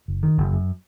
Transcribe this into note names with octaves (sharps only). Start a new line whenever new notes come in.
F#1
D#3
F#1
F#2